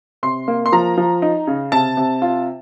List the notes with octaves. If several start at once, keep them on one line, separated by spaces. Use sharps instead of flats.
C3 C6
A#3
C6
F3 A#5
F3
D#4
C#3
C3 A5
C3
F4